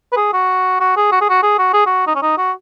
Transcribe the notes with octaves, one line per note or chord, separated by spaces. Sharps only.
B4
G#4
F#4
F#4
G#4
F#4
G#4
F#4
G#4
F#4
G#4
F#4
D#4
C#4
D#4
F#4